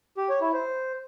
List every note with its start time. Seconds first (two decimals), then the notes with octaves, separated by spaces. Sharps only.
0.17 G4
0.29 C#5
0.41 E4
0.53 C5